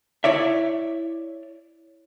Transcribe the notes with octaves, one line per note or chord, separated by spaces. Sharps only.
E4 C#5 D5 E5